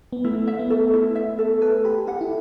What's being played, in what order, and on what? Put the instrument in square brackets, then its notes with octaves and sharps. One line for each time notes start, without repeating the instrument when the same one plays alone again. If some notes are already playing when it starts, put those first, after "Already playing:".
[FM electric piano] B3
[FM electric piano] A3 [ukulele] E4
[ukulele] E5
[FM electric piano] B3
[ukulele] A4
E4
E5
A4
[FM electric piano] A4 [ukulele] B4
[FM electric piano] G4 [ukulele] B5
[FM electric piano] G4 [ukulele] F#5
[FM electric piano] E4